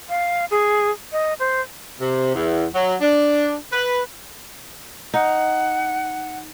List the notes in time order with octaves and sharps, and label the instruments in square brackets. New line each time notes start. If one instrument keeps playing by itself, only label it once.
[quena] F5
G#4
D#5
C5
[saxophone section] C3
E2
F#3
D4
B4
[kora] D#4 [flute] F#5